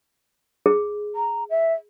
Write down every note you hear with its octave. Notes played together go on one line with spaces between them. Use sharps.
G#4
A#5
E5